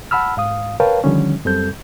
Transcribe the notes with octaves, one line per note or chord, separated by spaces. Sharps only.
F#5 A5 B5 E6 F6
G#2 F5 D#6
A#4 B4 C#5 F5 G5 A5
D3 D#3 F3 G3 C#4
F#2 G3 C4 A4 G6